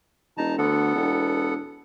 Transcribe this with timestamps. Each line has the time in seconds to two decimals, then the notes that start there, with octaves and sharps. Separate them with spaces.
0.37 E1 D#4 A5 A#5
0.58 D2 B3 A4 F#5
0.95 E1